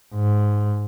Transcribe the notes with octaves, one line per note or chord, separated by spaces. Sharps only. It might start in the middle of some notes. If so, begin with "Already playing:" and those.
G#2